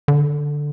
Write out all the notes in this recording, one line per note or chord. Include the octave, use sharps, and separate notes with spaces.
D3